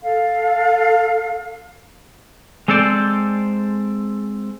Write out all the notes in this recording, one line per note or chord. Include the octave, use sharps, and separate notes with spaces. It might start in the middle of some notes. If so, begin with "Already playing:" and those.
A4 F5
G#3 C4 A4 C5 D5